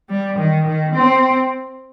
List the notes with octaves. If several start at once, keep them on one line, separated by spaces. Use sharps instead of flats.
G3
D#3
D#3
C4